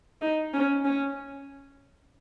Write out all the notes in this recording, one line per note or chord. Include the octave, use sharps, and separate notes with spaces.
D#4
C#4
C#4